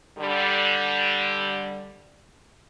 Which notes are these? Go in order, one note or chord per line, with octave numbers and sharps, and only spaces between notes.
D3 G3